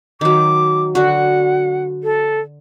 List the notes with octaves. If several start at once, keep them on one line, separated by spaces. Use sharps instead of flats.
D#3 F#3 D6
D3 F#4 F#5
A4